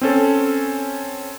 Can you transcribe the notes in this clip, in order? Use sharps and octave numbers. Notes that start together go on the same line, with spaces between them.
C4 C#4 A4